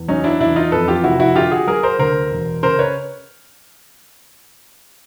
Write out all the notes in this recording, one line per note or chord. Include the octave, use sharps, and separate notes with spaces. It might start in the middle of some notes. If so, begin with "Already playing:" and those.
Already playing: E2
F#3 C#4 D#4
D4 E4
E2 D4 E4
D#4 F4
F2 A4 B4
F4 G4
F1 E4 F#4
E4 F#4
D3 F4 G4
F#4 G#4
F#3 G#4 A#4
A#4 C5
D2 A#4 C5
E1
C#3 A#4 C5
B4 C#5